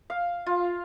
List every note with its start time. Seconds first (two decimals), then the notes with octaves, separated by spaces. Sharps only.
0.10 F5
0.46 F4